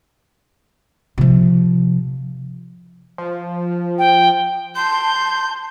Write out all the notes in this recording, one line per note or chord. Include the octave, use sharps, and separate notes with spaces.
C3 F3
F3
G5
A5 C6 G6